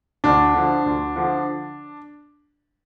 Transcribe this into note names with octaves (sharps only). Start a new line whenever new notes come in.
D2 D4
D3 F3
D2
D3 F3